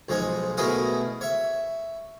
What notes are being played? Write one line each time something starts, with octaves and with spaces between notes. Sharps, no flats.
B1 F3 G#3 C#5
B2 A3 B3 E4 G#4 A#4
C#5 E5